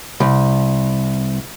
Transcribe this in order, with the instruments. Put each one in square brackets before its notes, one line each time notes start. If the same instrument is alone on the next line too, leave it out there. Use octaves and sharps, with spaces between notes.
[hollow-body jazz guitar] C2